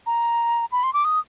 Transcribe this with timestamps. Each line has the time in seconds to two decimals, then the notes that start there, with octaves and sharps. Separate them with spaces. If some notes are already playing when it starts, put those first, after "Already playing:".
0.06 A#5
0.72 B5
0.83 C6
0.93 D6
1.05 D#6